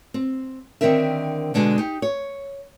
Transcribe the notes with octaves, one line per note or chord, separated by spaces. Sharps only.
C4
D3 D#3 C4 E4 A#4 E5
B2 D3 G#3
D#4 G4
C#5